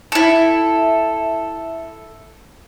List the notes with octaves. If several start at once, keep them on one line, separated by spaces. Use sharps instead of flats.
E4 A4